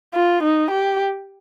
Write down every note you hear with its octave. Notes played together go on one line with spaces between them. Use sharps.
F4
D#4
G4